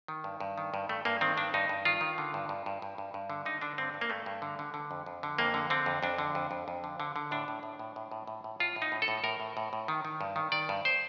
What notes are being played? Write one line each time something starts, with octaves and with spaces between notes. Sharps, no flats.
D#3
G2
G2
D#3
G2
G2 A3
G2 A#3
D#3 C4
G2 D4
G2 D#4
G2
D#3 F4
D#3
D3
G2
G2
G2
G2
G2
G2
D3
D3 D#4
D3 D4
G2 C4
G2
A#3
G2 A3
G2
D3
D3
D3
F2
F2
D3
F2 A#3
D3
D3 C4
F2
F2 D4
D3
F2
F2
F2
D3
D3
D3
A2 D4
A2
A2
A2
A2
A2
A2
A2
A2 F4
A2
D#4
A2
A4
A2
A2 A#4
A2
A2
A2
D#3
D#3
G2
D#3
D#3 D5
G2
C5